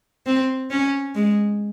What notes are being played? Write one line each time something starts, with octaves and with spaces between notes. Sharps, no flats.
C4
C#4
G#3